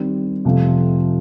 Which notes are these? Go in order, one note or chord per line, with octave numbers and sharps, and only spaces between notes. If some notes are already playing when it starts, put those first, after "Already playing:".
Already playing: D#3 G3 C4
F2 C3 F3 A3